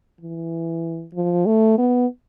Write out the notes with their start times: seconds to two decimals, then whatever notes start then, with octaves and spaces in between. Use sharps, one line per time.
0.21 E3
1.15 F3
1.46 A3
1.78 B3